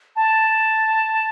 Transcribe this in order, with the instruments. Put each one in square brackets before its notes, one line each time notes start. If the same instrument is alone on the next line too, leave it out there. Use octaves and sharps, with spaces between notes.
[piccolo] A5